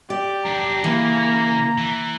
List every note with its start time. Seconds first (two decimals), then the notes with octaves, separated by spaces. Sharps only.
0.10 G4 D5
0.46 F#2 D4 A#5
0.84 C#3 E3 A#3
1.78 E3